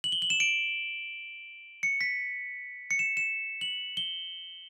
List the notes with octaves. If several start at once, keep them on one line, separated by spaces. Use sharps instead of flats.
F#7
G7
F#7
E7
D7
C#7
B6
C#7
E7
E7
F#7
G7